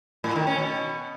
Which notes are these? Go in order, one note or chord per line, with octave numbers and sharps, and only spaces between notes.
A2
D#3
C#4
B2